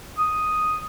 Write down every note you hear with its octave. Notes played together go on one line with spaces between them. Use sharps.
D#6